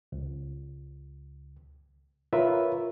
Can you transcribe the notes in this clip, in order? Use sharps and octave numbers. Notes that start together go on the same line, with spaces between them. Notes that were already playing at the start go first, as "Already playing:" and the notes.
C#2
F4 A#4 B4 C#5 E5